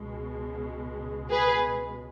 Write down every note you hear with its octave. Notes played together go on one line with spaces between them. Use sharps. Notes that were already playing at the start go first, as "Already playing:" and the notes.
Already playing: C#2 B2 G#3
G#4 B4